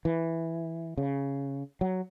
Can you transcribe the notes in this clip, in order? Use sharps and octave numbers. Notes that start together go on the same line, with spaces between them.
E3
C#3
F#3